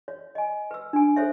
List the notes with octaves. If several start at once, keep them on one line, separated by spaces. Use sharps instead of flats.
C#5
D#5 G#5
B4 E6
D4 G#5
G#4 A4 C5 C#5 E5